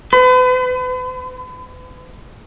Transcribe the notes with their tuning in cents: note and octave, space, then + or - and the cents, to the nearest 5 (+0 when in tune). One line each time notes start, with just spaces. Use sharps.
B4 +40